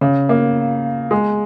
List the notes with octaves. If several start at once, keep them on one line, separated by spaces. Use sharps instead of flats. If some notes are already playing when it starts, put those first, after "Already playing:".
C#3
A#3
G#3